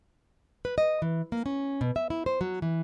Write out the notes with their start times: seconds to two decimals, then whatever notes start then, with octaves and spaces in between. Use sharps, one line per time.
0.65 B4
0.78 D#5
1.02 E3
1.32 A#3
1.46 C#4
1.81 B2
1.96 E5
2.10 E4
2.26 C5
2.41 F#3
2.62 E3